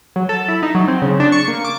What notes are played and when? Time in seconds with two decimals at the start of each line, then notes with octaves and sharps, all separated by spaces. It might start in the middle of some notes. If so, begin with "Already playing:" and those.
0.16 F#3
0.29 A4
0.48 E4
0.63 D#4
0.75 F#3
0.88 C4
1.02 C#3
1.20 D4
1.32 C#6
1.48 A#3
1.65 D6